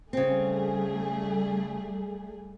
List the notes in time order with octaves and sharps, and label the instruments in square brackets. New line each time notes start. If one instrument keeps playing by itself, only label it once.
[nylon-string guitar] C#3 C4 [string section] G3 A3 G#4